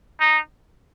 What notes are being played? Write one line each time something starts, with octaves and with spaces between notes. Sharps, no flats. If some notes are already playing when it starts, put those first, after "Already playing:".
D#4